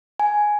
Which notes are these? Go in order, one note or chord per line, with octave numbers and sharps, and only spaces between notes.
G#5